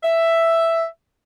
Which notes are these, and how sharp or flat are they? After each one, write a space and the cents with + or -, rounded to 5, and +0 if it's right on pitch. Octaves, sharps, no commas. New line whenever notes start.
E5 +5